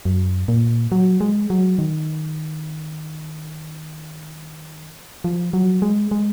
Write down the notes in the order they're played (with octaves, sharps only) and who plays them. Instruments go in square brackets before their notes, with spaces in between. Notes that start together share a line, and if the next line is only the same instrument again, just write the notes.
[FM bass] F#2
A#2
F#3
G#3
F#3
D#3
F3
F#3
G#3
G#3